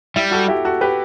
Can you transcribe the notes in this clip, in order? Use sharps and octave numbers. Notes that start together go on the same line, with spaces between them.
G3 E4
F#4 A4
E4 G4
F#4 A4
G4 B4